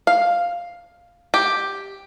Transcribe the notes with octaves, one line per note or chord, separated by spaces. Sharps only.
F5
G4